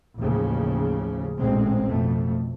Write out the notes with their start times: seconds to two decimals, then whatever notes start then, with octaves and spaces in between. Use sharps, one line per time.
0.18 A1 D#2 C#3 F3
1.38 A1 D2 A#2 G#3 C4
1.88 F2 B2 A3